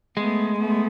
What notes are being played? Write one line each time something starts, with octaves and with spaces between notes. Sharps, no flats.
G#3 A3 B3
A3 B3